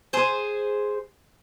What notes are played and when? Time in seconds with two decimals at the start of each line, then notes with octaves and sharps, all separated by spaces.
0.13 G#4 C5